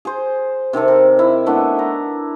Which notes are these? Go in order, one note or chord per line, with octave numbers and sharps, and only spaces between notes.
G#4 C5
C3 D#3 C4 A4
A#4
E4
A3 B3 D4 E4
A#5